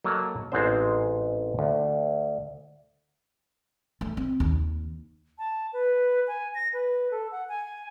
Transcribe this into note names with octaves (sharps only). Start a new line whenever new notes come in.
F#3 A#3 A4 D#5
A1 G#2 G#3 C4 C5
D2
A3
C4
D#2
A5
B4
G#5
A#6
B4
A4
F#5
G#5